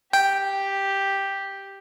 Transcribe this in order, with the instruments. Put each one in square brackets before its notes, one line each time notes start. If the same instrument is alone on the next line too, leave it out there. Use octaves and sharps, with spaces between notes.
[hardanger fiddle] G4 [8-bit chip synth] G5